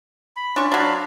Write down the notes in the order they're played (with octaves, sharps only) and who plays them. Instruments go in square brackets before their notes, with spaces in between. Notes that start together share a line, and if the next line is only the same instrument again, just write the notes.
[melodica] B5
[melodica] C#4 F4 [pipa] D4 C#6
[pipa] F#3 D4 [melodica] F#4 F5 B5